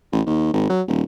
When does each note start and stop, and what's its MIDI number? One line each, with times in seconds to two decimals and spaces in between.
0.12 0.21 33
0.27 0.51 39
0.54 0.69 32
0.69 0.82 54
0.88 1.02 27